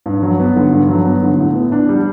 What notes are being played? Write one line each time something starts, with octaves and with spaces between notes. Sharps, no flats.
G2
F#3
B3
D3
G2
F#3
B3
D3
A2
B3
D4
G3